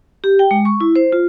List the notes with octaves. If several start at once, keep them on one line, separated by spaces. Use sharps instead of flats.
G4
G5
G#3
C#6
E4
C5
F4